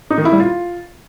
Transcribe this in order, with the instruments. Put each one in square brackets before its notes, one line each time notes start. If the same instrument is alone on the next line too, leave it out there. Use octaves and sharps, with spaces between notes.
[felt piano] D#4
D#3
E4
G3
F4